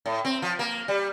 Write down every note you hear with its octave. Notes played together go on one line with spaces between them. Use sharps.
A2
C4
F3
A#3
G3